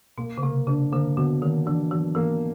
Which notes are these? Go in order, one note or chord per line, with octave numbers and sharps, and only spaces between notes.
B2 A#3
C#3
C3 A#3
C#3 D4
D3 A#3
B2 D3
D#3 A#3
E3 D4
E3 F#3
E3 A#3